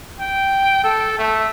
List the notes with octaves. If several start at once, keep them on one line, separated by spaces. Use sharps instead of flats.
G5
A4
A3